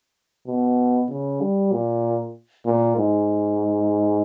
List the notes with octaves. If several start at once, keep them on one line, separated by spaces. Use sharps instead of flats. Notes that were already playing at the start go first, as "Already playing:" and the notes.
B2
C#3
G3
A#2
A#2
G#2